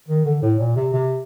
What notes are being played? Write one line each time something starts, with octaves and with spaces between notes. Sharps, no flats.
D#3
D3
A2
A#2
C3
C3